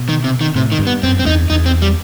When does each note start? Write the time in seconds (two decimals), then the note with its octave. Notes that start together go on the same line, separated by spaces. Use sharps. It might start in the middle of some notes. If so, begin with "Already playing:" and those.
Already playing: B2
0.09 D#3
0.24 C3
0.41 D#3
0.55 A2 C3
0.72 D#3
0.79 G2
0.87 B3
1.03 F#2 C4
1.19 C4
1.26 E2 D#4
1.50 E2 D#4
1.66 C4
1.82 G3